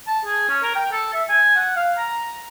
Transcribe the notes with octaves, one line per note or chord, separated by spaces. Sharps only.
A5
G#4
C#4
A#4
G5
A4
E5
G#5
F#5
F5
A#5